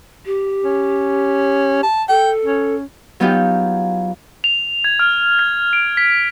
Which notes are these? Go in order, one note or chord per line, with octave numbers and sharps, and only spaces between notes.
G4
C#4
A5
A4 G5
C#4
F#3 B3 D#4 F4 G4
F7
G#6
F6
G#6
D7
B6